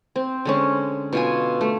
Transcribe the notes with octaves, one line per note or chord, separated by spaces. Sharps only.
C4
D3 G#3 C#4
B2 F4 G#5
A3